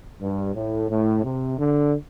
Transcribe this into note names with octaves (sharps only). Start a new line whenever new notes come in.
G2
A2
A2
C3
D3